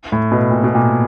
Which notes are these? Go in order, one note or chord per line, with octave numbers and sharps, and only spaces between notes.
A2
B2
A#2
B2
A#2